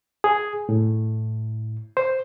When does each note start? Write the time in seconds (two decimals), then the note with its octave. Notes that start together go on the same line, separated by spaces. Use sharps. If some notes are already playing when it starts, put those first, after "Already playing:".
0.24 G#4
0.69 A2
1.97 C5